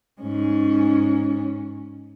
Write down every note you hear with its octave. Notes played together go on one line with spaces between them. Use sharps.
G#2 C#4